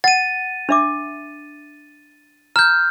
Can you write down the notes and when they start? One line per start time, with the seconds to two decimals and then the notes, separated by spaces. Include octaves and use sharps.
0.04 F#5 A6 D#7
0.69 D4 E5 D6
2.56 A#5 F6 G6